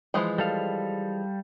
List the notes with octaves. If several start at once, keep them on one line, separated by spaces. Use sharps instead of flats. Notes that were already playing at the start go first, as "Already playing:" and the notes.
E3 F3 G#3
G3 A4 F5